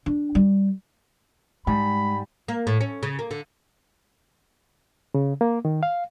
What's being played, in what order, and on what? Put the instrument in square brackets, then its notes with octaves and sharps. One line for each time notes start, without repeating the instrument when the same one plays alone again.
[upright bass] D4
G3
[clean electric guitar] G#2 G3 [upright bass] G#3 [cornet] B5
[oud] A#3
A2
C#4
C#3
A#3
D3
[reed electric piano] C#3
A#3
D#3
F5